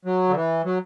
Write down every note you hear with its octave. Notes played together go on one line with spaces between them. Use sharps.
F#3
D3
E3
F#3